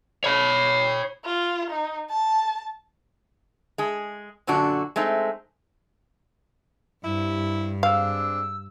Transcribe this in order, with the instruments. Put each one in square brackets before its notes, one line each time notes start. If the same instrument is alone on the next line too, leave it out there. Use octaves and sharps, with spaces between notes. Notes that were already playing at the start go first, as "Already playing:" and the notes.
[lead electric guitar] C#5 B5
[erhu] F4
D#4
A5
[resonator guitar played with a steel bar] G#3 G#4
F#2 A#2 D3 D4 F#4
G#3 A3 C4 D#4
[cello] G2 [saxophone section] C3 E4
[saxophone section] G#3 C4 D4 [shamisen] F5 [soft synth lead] E6